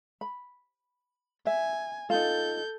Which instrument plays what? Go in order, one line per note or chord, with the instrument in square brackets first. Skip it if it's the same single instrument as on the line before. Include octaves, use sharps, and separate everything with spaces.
[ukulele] B5
[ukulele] E5 [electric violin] G#5
[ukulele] D#4 F4 [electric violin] A4 G6